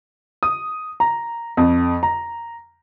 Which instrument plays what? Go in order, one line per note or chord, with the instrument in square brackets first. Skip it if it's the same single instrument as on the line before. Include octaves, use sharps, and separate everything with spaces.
[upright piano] D#6
A#5
F2
A#5